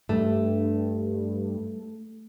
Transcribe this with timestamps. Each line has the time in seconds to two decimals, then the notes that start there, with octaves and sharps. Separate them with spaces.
0.09 G2 A3